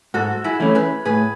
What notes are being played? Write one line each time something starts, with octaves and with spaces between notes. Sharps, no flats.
G#2 F#4 A4
E4 G#4
E3 A3 C#4
G#4 B4
A2 G#4 B4